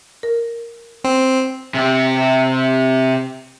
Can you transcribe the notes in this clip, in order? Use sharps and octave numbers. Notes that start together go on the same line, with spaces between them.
A#4
C4
C3 G4